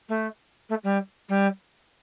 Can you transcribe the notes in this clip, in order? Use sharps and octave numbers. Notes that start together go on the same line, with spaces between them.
A3
A3
G3
G3